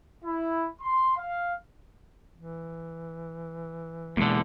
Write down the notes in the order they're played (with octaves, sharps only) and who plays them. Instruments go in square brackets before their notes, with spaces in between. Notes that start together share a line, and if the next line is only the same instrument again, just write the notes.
[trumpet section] E4
C6
F5
[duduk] E3
[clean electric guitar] E2 D3 [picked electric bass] B2 G#3 A#3